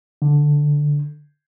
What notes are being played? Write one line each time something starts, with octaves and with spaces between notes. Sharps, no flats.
D3